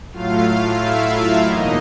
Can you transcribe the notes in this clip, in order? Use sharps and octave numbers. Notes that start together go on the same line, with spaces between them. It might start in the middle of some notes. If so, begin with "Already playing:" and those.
A2 F#3 A3 F4 F5
E4 E5
E2 B2 F#3 A#3 D#4 D#5